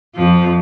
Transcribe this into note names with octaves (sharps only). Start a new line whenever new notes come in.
F2 F3